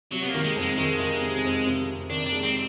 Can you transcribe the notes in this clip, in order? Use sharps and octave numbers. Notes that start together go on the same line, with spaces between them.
C3 F#3
B3
A#3
D#3
G#3
F2
G#3
D#3 G#3
D#3
C3
F2
C3
F2
D#3 D4
D4
G#3
C4